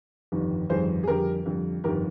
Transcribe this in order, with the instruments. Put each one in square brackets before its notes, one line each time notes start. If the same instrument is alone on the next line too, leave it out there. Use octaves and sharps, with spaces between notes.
[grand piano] G1 F2 D#3 G3
G1 F2 D#3 G3 G#4 C5
G#4
F2 D3 G3 G4 A#4
F2 D3 G3
G1 F2 D#3 G4 A#4